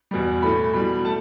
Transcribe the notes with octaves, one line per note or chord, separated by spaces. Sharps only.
E2 B2 G3
A2 E3 A3 B5
B2 G3 B5
A3 A5